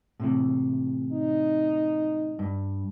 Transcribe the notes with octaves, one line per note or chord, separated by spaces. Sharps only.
A2 C3 E3
D#4
G2